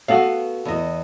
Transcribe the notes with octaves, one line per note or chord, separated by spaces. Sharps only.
B3 F#4 A4 F5
E2 D#5